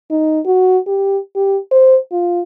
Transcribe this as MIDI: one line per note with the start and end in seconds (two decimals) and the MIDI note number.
0.11 0.40 63
0.46 0.78 66
0.87 1.18 67
1.36 1.58 67
1.71 1.97 72
2.12 2.42 65